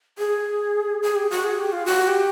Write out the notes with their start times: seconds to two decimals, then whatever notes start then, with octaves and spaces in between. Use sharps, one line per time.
0.18 G#4
1.03 G#4
1.16 G4
1.30 F#4
1.44 G#4
1.59 G4
1.72 F4
1.86 F#4
2.07 G4